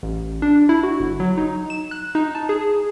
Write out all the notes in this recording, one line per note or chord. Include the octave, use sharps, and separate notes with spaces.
A1
D4
E4
F#4
G1
F#3
D#4
E7
F#6
D#4
A5
G#4